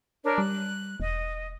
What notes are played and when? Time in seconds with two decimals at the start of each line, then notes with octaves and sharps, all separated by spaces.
0.24 D4 A#4 C#5
0.38 G3 F#6
1.00 E1 D#5